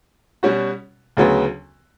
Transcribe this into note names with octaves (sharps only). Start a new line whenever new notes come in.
B2 G3 C#4 F#4
D2 C#3 F#3 B3